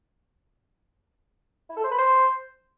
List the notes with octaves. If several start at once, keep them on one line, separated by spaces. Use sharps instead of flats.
E4
A4
C5
B4
C5